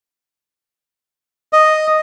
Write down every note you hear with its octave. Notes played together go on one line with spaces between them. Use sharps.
D#5